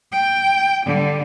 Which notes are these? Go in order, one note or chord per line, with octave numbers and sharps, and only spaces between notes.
G5
D3 G3